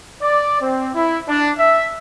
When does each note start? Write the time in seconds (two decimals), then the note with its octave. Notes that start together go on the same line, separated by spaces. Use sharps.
0.22 D5
0.62 C4
0.94 E4
1.28 D4
1.58 E5